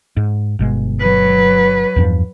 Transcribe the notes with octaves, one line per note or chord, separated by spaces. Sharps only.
G#2
G1 B2 G#3
F#3 B4
E2 G2 F3